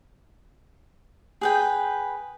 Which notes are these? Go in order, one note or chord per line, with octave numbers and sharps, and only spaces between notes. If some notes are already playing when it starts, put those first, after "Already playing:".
G#4 B4 G5